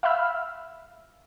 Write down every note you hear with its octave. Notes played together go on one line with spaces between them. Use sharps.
E5 F5 B5 E6 F6